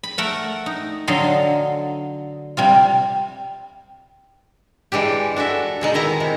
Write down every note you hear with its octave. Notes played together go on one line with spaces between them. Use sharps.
B5
A3 A#4 E5 F#5
D#4
D3 F#3 A4 D#5 F5 C6
C3 G3 F4
E3 G#3 D4 G4
D4 F#4 A4 E5
B2 G#3 D#4
D#3 E4 A#5
C3